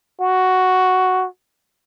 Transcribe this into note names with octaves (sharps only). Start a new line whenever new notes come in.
F#4